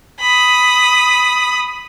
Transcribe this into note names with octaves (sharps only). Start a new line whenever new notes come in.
B5 D#6